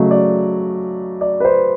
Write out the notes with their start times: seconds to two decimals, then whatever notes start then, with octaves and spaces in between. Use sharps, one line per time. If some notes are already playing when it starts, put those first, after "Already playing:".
Already playing: C#3 F#3 A3 D#5
0.11 D5
1.21 D5
1.40 B4
1.45 C5